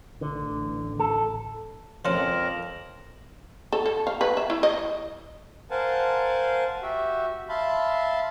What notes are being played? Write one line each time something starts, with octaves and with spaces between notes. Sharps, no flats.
A1 D3
A4
F2 F3 C#4 A#4 C6 E7 F#7
A4
A4
F5
B4
E5
E4
D#5
A#4 C5 F5 F#5 G#5 A5
F#4 G4 E5
E5 F5 A5 B5 C6